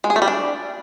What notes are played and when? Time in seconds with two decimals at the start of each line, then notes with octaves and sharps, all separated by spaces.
0.04 G#3
0.10 G#4
0.16 A3
0.22 G3
0.28 D4